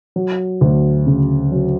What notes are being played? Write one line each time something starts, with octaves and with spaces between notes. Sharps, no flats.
F#3
D2
C#3
F#3